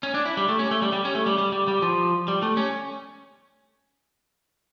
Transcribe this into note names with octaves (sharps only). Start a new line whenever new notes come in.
C#4
D4
E4
G3
A3
C#4
A3
G3
G3
C#4
A3
G3
G3
G3
G3
F3
G3
A3
C#4